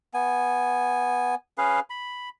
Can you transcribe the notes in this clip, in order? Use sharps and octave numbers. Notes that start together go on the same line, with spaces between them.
B3 G#5
C#4 G#4 B4 F5
B5